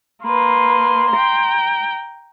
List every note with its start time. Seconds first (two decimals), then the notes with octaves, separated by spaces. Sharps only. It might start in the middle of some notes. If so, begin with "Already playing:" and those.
0.23 A#3 B4 C6
1.11 G5 A#5